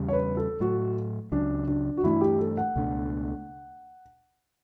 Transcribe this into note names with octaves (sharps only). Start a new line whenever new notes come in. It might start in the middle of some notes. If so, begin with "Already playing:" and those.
Already playing: E2 C#3 G3
C#5
B4
A4
A2 F#3 A3 F#4
C#2 C#3 F#3 D4
D4
F#4
G2 E3 A3 D4 E4
G4
A4
F#5
C#2 B2 A3 D4